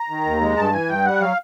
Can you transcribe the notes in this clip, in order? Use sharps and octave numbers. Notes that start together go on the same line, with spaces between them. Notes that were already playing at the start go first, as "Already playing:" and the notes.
Already playing: A#5
D#3
D#2
G#3
G2 A5
E3 G#5
G2 G5
G3 F#5
F#3 F5